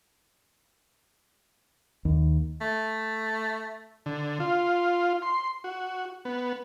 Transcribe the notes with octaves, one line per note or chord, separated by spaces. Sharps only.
D#2
A3
D3
F4
C6
F#4
B3